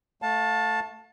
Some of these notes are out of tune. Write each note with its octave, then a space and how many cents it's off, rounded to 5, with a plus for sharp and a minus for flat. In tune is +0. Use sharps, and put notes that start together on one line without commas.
A3 +0 F5 +40 A5 +0